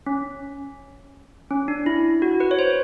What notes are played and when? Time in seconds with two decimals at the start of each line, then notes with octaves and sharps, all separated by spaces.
0.06 C#4
1.51 C#4
1.68 D4
1.86 E4
2.22 F#4
2.40 B4
2.51 C#5
2.59 C5